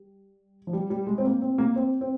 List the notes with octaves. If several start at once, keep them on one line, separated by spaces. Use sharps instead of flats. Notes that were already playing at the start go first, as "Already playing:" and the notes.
Already playing: G3
F3
G3
G3
G#3
C4
A#3
C4
A#3
C4
C4